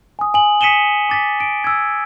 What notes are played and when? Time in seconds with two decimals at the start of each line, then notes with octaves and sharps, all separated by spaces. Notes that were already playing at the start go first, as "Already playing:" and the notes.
0.19 G#5 D#6
0.34 G#5 F#7
0.61 D#6 B6 C#7 D#7 E7 G7
1.09 D6 A6 B6
1.40 D7
1.64 E6 G#6